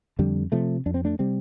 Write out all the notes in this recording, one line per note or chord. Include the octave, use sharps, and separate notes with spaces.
F2 D3 G3
C3 F3 A3
F2 D4
C4
A3 D4
C3 G3 C4